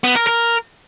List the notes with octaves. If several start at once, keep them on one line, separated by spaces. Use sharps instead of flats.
B3
A#4
A#4